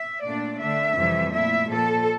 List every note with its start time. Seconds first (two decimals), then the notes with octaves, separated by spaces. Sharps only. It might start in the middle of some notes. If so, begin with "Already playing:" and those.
Already playing: E5
0.23 A#2 A3 D4 D5
0.60 D3 A3 D4 E5
0.96 F2 C3 E3 G3
1.32 A#2 A3 E4 E5
1.69 A#2 F3 A#3 A4